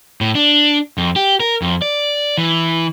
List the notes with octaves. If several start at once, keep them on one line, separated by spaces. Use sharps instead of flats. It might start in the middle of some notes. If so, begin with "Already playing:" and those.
A2
D4
F2
G4
A#4
F2
D5
E3